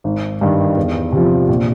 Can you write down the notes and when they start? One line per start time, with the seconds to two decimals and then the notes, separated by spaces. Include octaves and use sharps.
0.04 G#1
0.41 G2 D#3
0.77 E2
1.12 C3 F3
1.48 A#1